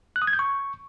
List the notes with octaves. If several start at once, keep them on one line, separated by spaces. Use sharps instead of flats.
F#6
D#6
G#6
G6
C#6